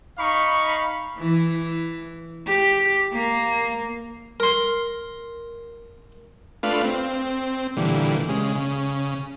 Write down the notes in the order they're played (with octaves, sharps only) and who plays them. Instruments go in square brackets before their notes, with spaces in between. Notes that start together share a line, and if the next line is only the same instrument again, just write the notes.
[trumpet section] D#4 F5 B5 C#6
[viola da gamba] E3
G4
A#3
[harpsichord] A#4 C6
[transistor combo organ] A3 D4 F4 B4 F5
C4
A#2 D3 E3 G3
C#3 G#3
C#3